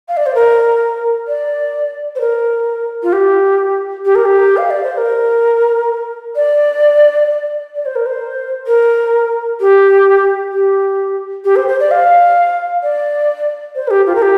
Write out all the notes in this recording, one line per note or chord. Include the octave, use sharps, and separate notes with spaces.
F5
D5
C5
A#4
D5
C5
A#4
F4
G4
G4
A#4
G4
F5
D5
C5
A#4
D5
D5
C5
A#4
C5
A#4
G4
G4
G4
C5
C5
D5
F5
D5
C5
A#4
G4
F4
A#4
G4